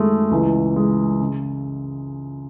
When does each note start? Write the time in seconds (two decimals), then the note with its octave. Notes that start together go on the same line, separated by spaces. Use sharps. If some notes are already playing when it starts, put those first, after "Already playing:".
Already playing: F#2 D#3 G#3 A3
0.31 C#2 C#3 E3
0.76 G#3
1.21 C#3